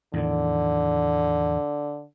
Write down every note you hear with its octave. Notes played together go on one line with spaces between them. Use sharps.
E2 A2 D3 D#3